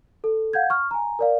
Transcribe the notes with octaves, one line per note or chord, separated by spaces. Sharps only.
A4
F5 F#5 G6 G#6
C#6 F6
G#5 A#5
A#4 D5 F5